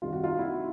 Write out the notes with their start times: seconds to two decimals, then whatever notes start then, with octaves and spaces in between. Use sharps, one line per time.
0.02 C2 C3 D#3 F4
0.13 F#4
0.23 D#4 F4
0.39 E4 F#4